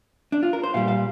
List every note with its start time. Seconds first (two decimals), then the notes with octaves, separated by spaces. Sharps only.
0.32 D4
0.43 F4
0.53 A#4
0.63 C5
0.74 A#2 G3 F5
0.88 F5